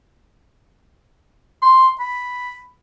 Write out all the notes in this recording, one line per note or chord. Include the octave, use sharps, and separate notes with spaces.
C6
B5